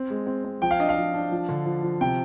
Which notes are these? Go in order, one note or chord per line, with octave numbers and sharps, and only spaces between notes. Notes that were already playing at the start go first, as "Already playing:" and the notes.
Already playing: C4
G#3
C4
C4
F3 G5
F5
D4 D#5
F5
F3
D4
F3
D3
F3
F3
C3 G5